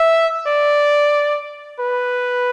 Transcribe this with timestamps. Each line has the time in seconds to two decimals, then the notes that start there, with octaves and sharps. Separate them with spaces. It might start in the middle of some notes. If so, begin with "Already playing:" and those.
Already playing: E5
0.47 D5
1.80 B4